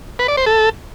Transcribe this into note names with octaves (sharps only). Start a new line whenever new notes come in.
B4
D5
C5
A4